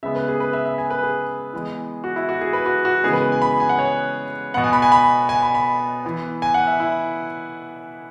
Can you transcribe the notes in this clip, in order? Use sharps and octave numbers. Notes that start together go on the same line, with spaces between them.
C#3 G#3 B3 E5
B4
G#4
B4
E5
E5
G#5
B4
G#4
E3 G#3 B3
F#4
E4
F#4
G#4
B4
F#4
F#4
C#3 E3 G#3 B3 G#4
B4
G#5
B5
G#5
F#5
C#5
B2 B3 F#5
G#5
B5
G#5
B5
G#5
B5
B5
E3 B3
G#5
F#5
E5
E4